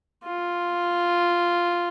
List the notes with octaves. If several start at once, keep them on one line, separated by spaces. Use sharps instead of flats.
F4